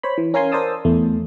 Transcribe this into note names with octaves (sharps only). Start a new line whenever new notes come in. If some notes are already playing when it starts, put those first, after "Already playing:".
C5 C#5 B5
E3
C#4 A#4 F5 G#5 C6
A#4 C5 D5 A5 D#6 E6
E2 A3